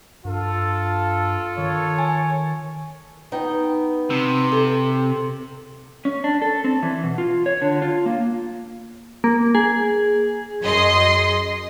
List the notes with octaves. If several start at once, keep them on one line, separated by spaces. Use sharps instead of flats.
G2 F4 A4
D#3 C#5
G#5
B3 D#4 G5
C3
A4
C#4
D4
A4
C4
E3
B2
F4
C#5
D3
F4
A#3
A#3
G#4
F#2 D#5 C6